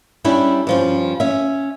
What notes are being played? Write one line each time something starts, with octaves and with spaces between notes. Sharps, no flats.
G3 C#4 D4 E4
G2 F3 C#4
C#4 E5